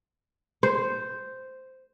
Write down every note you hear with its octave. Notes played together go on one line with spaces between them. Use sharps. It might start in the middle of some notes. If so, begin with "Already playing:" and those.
C5